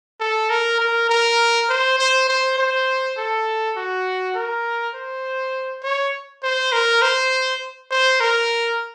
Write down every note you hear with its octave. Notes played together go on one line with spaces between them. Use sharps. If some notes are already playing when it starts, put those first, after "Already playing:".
A4
A#4
A#4
A#4
C5
C5
C5
C5
A4
F#4
A#4
C5
C#5
C5
A#4
C5
C5
A#4